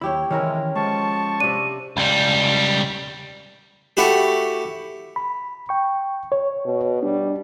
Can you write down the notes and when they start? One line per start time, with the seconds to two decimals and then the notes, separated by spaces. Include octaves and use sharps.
0.01 D#2 E4 G4 C#5 B5
0.31 C3 D#3 E3 G#3 C#4 E4 A#4
0.75 F3 G#3 A5 C#6
1.40 C3 D4 D#7
1.97 C#2 G3
3.97 A3 E4 F#4 G4
5.16 B5
5.69 G5 C#6
6.32 C#5
6.65 B2
7.03 G3 D4